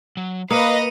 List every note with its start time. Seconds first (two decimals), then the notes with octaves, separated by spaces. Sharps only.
0.17 F#3
0.51 A#3 B4 D#5 F5 D#6 C#7 D#7